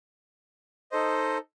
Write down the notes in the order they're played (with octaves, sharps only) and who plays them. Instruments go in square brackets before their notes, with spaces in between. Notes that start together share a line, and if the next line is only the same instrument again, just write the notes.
[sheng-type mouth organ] D#4 A4 C5 D#5